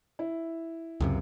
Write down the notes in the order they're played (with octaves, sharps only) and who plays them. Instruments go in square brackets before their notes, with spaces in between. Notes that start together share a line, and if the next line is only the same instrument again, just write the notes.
[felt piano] E4
[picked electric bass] C#2 F#2 C3